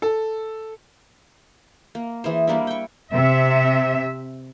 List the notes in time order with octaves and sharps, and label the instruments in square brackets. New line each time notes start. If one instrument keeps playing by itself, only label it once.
[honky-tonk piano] A4
[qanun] A#3
E3 G#4 C5
G3 A#3 D4 E4
G5 C#6
[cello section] C3 E5